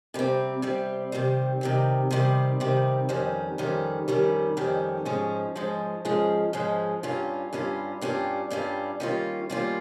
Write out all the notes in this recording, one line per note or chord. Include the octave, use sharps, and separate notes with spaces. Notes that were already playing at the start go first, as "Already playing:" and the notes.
C3 G3 C4
C3 G3 C4
C3 D#3 G3 C4
C3 D#3 G3 C4
C3 D#3 G3 C4
C3 D#3 G3 C4
F2 D#3 G3 C#4
F2 D#3 G3 C#4
F2 D#3 G3 C#4
F2 D#3 G3 C#4
G#2 F3 G#3 C#4
G#2 F3 G#3 C#4
G#2 F3 G#3 C#4
G#2 F3 G#3 C#4
G2 G3 C#4 F4
G2 G3 C#4 F4
G2 G3 C#4 F4
G2 G3 C#4 F4
D#3 G3 A#3 C#4 F4
D#3 G3 A#3 C#4 F4